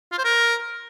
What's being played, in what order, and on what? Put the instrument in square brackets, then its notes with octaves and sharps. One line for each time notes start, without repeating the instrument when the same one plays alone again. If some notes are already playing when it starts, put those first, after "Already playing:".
[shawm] F4
C5
A#4